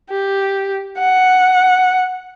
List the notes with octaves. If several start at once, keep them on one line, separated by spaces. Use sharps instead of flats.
G4
F#5